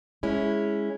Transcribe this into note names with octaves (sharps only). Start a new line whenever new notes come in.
G#3 C#4 E4